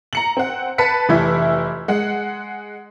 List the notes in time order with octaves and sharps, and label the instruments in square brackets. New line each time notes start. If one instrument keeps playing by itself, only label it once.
[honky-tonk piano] A#5 C#7 F#7
C4 F#5
B4 A5 B6 C#7
F1 E3 E4
G#3 F#5